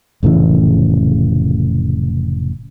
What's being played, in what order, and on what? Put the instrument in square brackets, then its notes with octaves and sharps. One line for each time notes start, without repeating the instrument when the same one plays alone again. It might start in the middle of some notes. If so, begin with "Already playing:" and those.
[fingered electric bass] F1 A2 C#3 E3